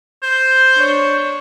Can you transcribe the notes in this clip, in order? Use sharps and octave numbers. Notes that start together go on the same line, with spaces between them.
C5
D4 C#5